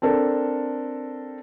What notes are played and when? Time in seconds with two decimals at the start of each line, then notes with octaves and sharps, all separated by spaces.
0.02 C4 D4 A4 A#4